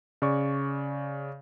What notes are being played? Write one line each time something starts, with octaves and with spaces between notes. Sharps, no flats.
C#3 D5 C#6